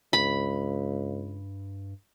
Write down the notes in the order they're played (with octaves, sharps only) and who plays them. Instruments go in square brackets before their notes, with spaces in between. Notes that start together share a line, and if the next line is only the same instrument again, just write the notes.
[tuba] C#2 [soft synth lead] G2 [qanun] B5